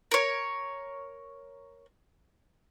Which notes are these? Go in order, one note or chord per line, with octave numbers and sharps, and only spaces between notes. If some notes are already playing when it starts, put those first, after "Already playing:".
A#4 C#5